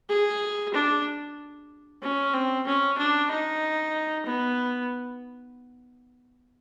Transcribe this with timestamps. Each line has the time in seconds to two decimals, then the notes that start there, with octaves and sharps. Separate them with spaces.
0.09 G#4
0.74 D4
2.03 C#4
2.34 C4
2.67 C#4
2.98 D4
3.31 D#4
4.26 B3